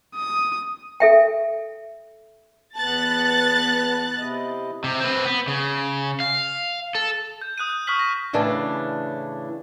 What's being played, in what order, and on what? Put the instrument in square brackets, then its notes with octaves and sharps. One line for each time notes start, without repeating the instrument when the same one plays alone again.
[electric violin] D#6
[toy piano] A4 E5 G5
[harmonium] E2 A5 [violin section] B3 F#6 A6
[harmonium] C3 E4 D#5
[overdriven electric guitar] C3
C4 B4
B3
C#3
F5
A4
[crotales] G6
D#6 F#6 G6 D#7
F#6
C#6 D#6 F6 F#6 B6 F#7
A#6
[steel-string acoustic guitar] A2 C#3 E3 A3 D4